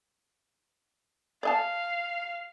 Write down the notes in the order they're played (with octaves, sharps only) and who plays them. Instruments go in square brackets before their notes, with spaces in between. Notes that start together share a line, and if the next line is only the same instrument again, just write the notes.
[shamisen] D5 D#5 A5 [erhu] F5